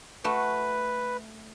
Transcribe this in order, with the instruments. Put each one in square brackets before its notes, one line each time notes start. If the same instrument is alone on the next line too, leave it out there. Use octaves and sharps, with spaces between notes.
[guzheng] A3 F#4 [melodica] B4